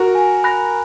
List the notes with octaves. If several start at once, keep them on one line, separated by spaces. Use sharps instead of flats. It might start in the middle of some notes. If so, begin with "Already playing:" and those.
Already playing: F#4 A#4
G#5
B5 F#6 A#6